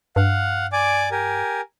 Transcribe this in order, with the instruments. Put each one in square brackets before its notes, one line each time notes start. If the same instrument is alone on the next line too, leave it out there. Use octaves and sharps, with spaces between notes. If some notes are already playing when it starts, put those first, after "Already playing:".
[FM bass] G2 [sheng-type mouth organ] F5 F#5
[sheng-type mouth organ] D5 G#5 D6
G4 A#4 G#5